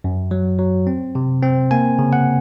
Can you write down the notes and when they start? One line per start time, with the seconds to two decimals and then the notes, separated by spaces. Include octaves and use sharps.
0.04 F#2
0.31 F#3
0.59 F#3
0.87 C4
1.15 C3
1.43 C4
1.71 A#3 G#5
1.99 C#3
2.13 F#5